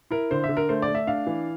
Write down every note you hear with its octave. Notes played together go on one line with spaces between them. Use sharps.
E4 A#4
D3 C5
E5
D3
A#4
A3 C5
D5
A3
E5
D4 F5
E3